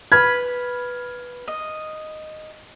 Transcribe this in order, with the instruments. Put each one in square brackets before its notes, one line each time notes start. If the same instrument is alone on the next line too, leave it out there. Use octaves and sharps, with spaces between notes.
[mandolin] B4 B5 [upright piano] F6 G#6
[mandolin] D#5